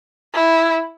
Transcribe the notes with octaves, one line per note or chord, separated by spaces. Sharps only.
E4